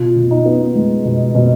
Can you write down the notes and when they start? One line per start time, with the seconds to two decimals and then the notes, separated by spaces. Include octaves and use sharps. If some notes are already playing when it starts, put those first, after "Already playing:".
Already playing: B2 F4
0.16 B2
0.31 D#4
0.46 B3
0.75 G#3
1.05 B2
1.35 B2